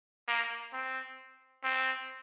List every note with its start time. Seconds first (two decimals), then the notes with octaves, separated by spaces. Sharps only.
0.28 A#3
0.73 C4
1.64 C4